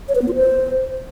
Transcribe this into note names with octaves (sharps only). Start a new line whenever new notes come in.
C#5
B4
B3
F4
C5